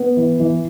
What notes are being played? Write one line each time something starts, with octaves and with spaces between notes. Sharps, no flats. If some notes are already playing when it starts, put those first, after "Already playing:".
Already playing: B3
E3
E3